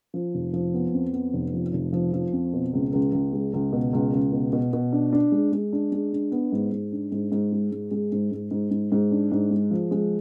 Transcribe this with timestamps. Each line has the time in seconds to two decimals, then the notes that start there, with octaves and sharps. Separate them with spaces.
0.14 F3
0.34 F1
0.53 F3
0.74 B3
0.94 F2
1.13 B3
1.33 F1
1.54 F3
1.73 F1
1.93 F3
2.13 F3
2.33 F2
2.53 B2
2.73 C#2
2.93 C#2
3.12 C#2
3.33 G#3
3.53 C#2
3.72 B2
3.93 C#2
4.13 C#2
4.32 B2
4.53 B2
4.73 B2
4.92 D4
5.12 D4
5.32 G#3
5.52 G#3
5.73 D4
5.92 G#3
6.13 D4
6.32 B3
6.52 G#2
6.72 G#2
6.92 D4
7.12 G#2
7.32 G#2
7.52 G#3
7.71 G#2
7.91 G#3
8.12 G#2
8.31 G#2
8.51 G#2
8.71 G#2
8.92 G#2
9.11 D4
9.32 G#2
9.51 G#3
9.71 F3
9.91 G#3